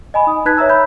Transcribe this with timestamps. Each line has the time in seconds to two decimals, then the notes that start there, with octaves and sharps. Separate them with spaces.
0.14 D#5 G#5 B5
0.27 D#4 D#6
0.46 D#4 B4 A5 F#6 G#6 B6
0.58 C#5 E5 A#5 E6
0.69 B5 G6